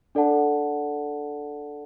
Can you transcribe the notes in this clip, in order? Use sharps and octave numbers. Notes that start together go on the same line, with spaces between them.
D4 A4 D5 F#5 A5